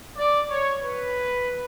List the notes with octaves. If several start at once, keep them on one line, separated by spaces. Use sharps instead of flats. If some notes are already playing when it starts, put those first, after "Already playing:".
D5
C#5
B4